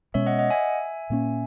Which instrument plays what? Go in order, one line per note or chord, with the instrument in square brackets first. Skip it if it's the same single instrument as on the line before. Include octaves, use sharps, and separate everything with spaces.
[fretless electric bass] B2 G#3 C#4 [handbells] C#5 E5
[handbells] D#5 F#5
D#5 F#5
E5 G#5
[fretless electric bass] A#2 A#3 C#4